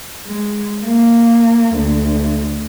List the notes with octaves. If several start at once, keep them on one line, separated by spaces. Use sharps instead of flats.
G#3
A#3
D2